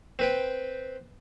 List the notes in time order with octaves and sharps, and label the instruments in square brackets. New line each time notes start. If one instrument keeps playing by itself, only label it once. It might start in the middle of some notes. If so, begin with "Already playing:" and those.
[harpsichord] C4 B4 G5